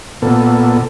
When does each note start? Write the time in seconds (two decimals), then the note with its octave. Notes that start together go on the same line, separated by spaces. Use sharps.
0.22 A#2 B3 A4